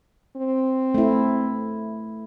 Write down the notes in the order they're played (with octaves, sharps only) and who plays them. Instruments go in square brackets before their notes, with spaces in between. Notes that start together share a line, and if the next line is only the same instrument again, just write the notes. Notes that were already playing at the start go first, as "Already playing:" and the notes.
[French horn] C4
[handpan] A3 E4